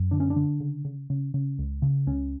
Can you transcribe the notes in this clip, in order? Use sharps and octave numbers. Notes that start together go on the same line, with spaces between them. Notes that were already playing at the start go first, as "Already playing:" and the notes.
Already playing: F#2
D3 D4
C#4
D4
D3
C#3
C#3
C#3
C#3
C#2
C#3
C#2 C#4